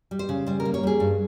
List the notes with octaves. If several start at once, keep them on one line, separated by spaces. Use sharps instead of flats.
G3
C5
C#3
G3 C5
A#4
A#3
C#5
G3 G#4
G2